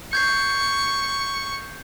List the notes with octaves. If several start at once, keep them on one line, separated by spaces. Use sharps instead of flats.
C#6 G6 G#6 C7